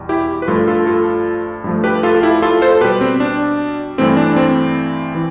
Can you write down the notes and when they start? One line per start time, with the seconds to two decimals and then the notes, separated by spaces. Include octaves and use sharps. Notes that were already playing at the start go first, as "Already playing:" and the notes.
Already playing: E2 B2 G3
0.09 E4 G4
0.42 B4
0.48 G2 F3 A3 F4 A4
0.67 F4 A4
0.87 F4 A4
1.64 G2 F3 A3
1.84 G4 B4
2.03 F4 A4
2.15 A4
2.23 E4 G4
2.42 F4 A4
2.62 A4 C5
2.81 B2 G3 G4 B4
3.01 C4
3.20 D4
3.98 G2 E3 A3 C4
4.17 D4
4.36 C4
5.15 E3